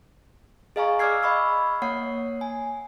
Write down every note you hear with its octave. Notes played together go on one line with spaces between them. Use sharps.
G#4 D#5 F5 G#5 A#5 C#6
D5 D6 E6 F6 G#6 C7
D#5 B5 C#6 E6
A#3 C#5 F#5 C7
G#5